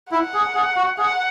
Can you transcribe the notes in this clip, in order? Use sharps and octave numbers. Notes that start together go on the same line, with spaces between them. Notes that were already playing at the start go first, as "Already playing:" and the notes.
E4 F#5
G#4
G#4
F#4
G#4 F#5